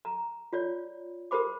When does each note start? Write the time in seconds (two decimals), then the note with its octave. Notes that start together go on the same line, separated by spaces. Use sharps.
0.05 A#5
0.53 F4 C#5 D5
1.31 G4 A#4 C5 B5 D6